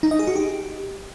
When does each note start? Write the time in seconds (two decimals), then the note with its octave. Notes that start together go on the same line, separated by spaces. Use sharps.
0.03 D#4
0.11 D#5
0.19 G#4
0.27 F#4
0.36 G4